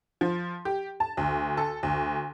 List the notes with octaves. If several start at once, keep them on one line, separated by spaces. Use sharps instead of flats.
F3
G4
A5
D2
A4
D2